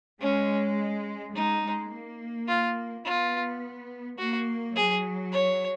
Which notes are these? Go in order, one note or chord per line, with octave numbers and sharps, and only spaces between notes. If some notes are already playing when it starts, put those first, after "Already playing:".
G#3 C#4
G#3 D#4
G#3
A#3
F4
B3 F4
A#3 F#4
F#3 G#4
C#5